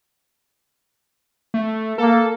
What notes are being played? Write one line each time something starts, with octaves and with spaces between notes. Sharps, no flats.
A3
A#3 A4